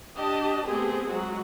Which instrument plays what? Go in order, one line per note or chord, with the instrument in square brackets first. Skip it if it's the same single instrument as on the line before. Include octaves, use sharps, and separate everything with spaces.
[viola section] D4 G4 D#5 A5
A3 B3 C4 G4 G#4
F#3 G#3 F#4